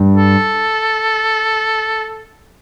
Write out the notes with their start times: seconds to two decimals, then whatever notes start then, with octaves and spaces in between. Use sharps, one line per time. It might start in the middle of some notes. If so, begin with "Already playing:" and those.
Already playing: G2
0.16 A4